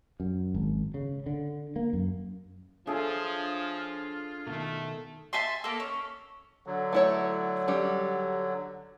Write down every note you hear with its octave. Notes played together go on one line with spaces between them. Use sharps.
F#2
G#1
C#3
D3
A#3
F#2
F3 D4 F4 G#4 A4 C#5 E5
B2 D#3 A3
E5 G#5 A5 C6
A#3 A4
C#4
D3 F#3
A3 E4 C#5
G3 C#4